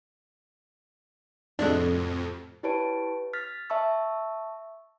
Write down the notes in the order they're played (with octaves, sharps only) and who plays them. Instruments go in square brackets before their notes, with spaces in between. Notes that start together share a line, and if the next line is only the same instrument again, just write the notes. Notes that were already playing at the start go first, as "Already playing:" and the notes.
[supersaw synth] F2 [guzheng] A2 C3 F#4 [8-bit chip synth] G#3 D4
[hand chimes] E4 G4 B4 C#5 A5 D7
F6 A6 B6
E5 A5 C#6 E6